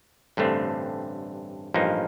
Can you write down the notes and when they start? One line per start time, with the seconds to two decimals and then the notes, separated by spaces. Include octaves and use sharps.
0.37 A1 G2 D3 A3 C4
1.74 A1 G2 F3 A#3 D#4